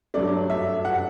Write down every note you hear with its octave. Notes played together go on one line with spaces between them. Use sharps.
G2 F#3 A3 D5
E5
F#5